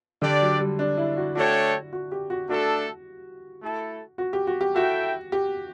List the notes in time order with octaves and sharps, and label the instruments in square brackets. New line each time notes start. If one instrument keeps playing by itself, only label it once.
[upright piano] D3 [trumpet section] D4 G4 D5
[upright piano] F#3
G3
D4
E4
F#4
[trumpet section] A3 D4 A4 C#5 G5 [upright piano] F#4
[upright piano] F#4
G4
F#4
[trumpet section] A3 D4 A4 [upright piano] F#4
[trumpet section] A3 E4 A4
[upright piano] F#4
G4
F#4
G4
[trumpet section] E4 A4 E5 G5 [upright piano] F#4
[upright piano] G4